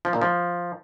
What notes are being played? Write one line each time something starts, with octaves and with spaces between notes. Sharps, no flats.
F3
A#2
F3